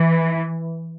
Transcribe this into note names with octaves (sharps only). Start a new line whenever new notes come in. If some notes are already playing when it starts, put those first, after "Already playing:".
Already playing: E3